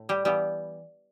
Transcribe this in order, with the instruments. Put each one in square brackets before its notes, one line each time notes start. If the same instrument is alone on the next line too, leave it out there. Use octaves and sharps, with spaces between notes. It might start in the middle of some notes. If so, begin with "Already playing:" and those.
Already playing: [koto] A2
G3 G4
E3 G3 B3 G4